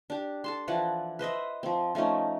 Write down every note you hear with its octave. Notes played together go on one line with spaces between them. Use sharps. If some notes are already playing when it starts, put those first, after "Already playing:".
D4 G4
A4 A5 C6
E3 F3 D5 F#5
B4 C5 D#5 E5
F3 C4
F3 A3 C#4 D#4